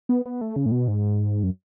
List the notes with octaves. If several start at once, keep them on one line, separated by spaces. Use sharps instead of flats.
B3
B3
A3
C#3
A2
B2
G#2
F#2